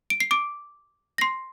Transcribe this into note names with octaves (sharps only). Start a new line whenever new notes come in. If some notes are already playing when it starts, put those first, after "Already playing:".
D7
C7
D6 D7
A#6
C6 C7